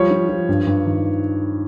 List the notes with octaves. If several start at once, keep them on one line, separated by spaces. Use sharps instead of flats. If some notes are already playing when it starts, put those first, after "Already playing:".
Already playing: F3 G3 C#5
F3
F3
G2
G2
D#3